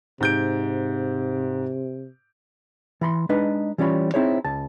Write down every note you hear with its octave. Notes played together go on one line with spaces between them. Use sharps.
G#2 C3 G6 D7
E3 B5 C6
G#3 D4 D#4 B4 D#5
E3 G3 C#4 F4 C#5 B5
C4 D#4 E4 G#4 C5 C#5
C#2 A5